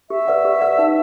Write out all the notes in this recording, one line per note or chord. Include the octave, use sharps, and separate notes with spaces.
G4 E5
B4 D5 F#5
G4
B4 D5 F#5
D#4